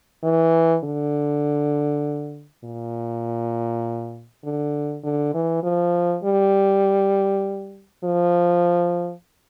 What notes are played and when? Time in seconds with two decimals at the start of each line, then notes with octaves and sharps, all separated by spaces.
0.24 E3
0.84 D3
2.64 A#2
4.44 D3
5.04 D3
5.34 E3
5.63 F3
6.24 G3
8.04 F3